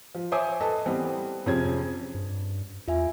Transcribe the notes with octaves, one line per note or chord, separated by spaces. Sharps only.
F3
C5 C#5 E5 G#5 D6 D#6
A4 B4 D#5 A5
E3 G3 B3 C4
F2 C3 C#4 G#4 C5 G#6
G2
E2 F4 E5 G#5